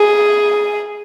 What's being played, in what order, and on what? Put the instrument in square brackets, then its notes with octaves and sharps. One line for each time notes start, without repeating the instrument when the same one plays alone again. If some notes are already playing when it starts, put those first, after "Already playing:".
Already playing: [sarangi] G#4